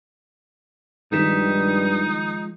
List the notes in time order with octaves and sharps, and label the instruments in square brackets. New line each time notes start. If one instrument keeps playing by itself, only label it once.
[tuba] G2 [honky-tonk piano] D#3 B6 E7 [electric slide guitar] F3 G#3 [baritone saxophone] D#4